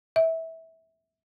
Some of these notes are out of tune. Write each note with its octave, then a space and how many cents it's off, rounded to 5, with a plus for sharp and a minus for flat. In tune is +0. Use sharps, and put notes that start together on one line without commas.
E5 -20